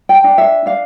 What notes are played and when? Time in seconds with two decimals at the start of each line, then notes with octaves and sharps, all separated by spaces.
0.09 G5
0.24 D4
0.38 E5
0.66 D4 F5